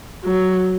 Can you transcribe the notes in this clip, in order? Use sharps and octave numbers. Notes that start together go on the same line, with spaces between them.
F#3